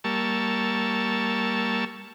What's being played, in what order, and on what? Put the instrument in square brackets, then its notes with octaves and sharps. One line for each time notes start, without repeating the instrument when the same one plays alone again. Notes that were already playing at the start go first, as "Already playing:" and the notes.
[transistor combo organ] G3 A#3 A5 C#6 E6